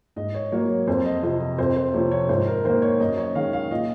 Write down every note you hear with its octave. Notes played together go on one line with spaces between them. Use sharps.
G#2 D#5
C#5
F#3 A#3 C#5
F2 C5
D#5
C3 F3 D#5
D#5
F2 C5
C5
C3 F3 C#5
C#5
G#2 C5
A#4
D#3 A#3 C5
C#5
F#2 D#5
C#5
D#3 G#3 F5
F5
A#2 D#5